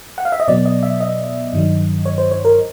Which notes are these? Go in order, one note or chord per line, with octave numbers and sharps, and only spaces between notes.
F#5
F5
E5
D#5
B2 F#3 B3 D5
D#5
E5
D#5
G2 D#3 F#3
C#5
C5
C#5
A#4